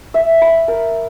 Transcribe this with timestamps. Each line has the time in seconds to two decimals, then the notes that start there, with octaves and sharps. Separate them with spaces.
0.14 E5
0.42 B5
0.68 A#4